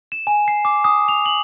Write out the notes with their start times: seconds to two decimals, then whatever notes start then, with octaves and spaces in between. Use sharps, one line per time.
0.12 E7
0.27 G#5
0.48 C7
0.65 D6
0.84 D#6
1.08 F7
1.26 F#7